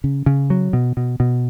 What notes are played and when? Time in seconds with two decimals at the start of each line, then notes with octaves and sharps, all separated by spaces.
0.04 C#3
0.26 C#3
0.50 F#3
0.73 B2
0.97 B2
1.20 B2